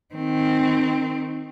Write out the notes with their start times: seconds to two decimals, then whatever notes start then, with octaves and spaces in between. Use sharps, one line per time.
0.14 D#3 C4